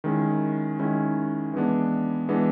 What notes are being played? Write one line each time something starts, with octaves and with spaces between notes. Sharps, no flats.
D#3 G#3 C#4 E4
D#3 G#3 C#4 E4
E3 G#3 B3 D4
E3 G#3 B3 D4